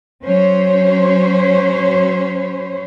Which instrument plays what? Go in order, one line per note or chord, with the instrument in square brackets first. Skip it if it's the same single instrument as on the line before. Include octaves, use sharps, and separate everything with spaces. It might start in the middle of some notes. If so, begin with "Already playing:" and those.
[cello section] F#3 C#4 C5 C#5